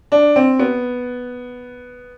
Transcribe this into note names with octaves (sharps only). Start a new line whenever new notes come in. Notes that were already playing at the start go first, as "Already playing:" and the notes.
D4
C4
B3